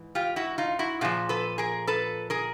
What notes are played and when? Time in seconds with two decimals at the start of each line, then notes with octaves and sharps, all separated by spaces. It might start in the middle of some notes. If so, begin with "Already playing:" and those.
Already playing: G#2 E3
0.15 F4 G4
0.36 E4 F#4
0.58 D#4 F4
0.79 E4 F#4
1.01 A#2 F3 F#4 G#4
1.29 A4 B4
1.58 G#4 A#4
1.87 A4 B4
2.30 G#4 A#4